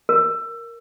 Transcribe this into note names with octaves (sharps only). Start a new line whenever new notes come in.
A#4